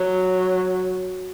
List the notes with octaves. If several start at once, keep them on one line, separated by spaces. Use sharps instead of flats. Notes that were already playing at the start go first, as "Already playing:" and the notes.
Already playing: F#3